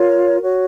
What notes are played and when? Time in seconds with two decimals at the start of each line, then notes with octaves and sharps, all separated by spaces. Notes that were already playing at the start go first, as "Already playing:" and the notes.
Already playing: F4 A#4 C#5
0.42 F#4 C#5